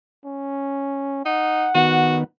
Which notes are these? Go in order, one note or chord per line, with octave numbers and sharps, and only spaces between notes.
C#4
D#4 F#5
D#3 B3 F#4